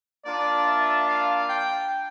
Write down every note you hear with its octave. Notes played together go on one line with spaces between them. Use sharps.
A#3 D4 F4 D5
E5
F5
G5